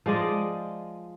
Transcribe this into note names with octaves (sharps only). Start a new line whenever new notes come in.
F3 G#3 D5 D#5